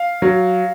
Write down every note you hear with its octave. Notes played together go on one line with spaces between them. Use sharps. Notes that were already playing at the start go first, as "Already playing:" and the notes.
Already playing: F5
F#3